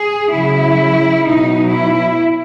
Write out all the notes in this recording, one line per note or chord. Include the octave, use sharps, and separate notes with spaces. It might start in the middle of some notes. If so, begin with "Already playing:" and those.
Already playing: G#4
C#3 F#3 E4
B2 F#3 D#4
E4